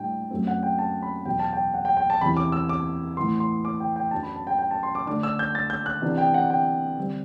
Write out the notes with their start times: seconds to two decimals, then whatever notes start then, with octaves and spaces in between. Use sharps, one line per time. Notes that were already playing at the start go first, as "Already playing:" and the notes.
Already playing: A2 G3 D4 G5
0.31 F#2 F#3 A3 C4
0.47 F#5
0.63 G5
0.79 A5
1.03 B5
1.25 E2 B2 F#3 G5
1.39 A5
1.53 G5
1.74 F#5
1.85 G5
1.97 G5
2.10 A5
2.21 E2 C3 E3 B5
2.37 D6
2.52 E6
2.69 D6
3.17 A2 E3 B3 C6
3.40 C6
3.65 D6
3.80 G5
3.96 G5
4.11 F#2 F#3 B3 D4 A5
4.23 B5
4.36 A5
4.47 G5
4.59 G5
4.71 A5
4.83 C6
4.95 D6
5.07 D3 A3 D4 D6
5.23 E6
5.39 G6
5.55 A6
5.70 G6
5.86 F#6
6.02 C3 E3 B3 D4
6.18 G5
6.34 F#5
6.50 G5
6.97 D3 G3 C4